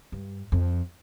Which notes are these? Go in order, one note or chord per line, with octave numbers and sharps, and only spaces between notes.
G2
F2